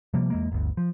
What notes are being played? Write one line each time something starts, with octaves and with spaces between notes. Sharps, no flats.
C3 F3 G3 A#3
E2 G#3 A#3
G1 D2
F3